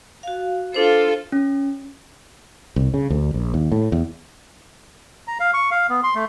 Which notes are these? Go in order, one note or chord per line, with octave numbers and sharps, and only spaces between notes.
F#4 F5
D4 F4 A4 C5
C#4
C2
C#3
D2
A#1
D#2
A2
E2
A#5
F5
C#6
F5
B3
C6
A3